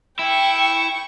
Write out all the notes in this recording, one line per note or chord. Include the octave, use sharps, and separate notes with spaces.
E4 G5 C#6